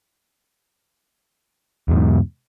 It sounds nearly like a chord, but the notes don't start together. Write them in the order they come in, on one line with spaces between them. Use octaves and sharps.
E2 B2 G#2